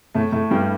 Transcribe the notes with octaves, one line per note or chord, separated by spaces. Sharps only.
A2 A3
A2 A3
G2 G3